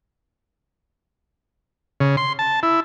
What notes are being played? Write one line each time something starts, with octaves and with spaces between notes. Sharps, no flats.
C#3
C6
A5
E4